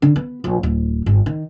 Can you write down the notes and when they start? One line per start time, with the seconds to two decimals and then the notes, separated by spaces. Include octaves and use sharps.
0.02 D3
0.16 B3
0.44 A#1
0.63 D1
1.06 G1
1.26 D#3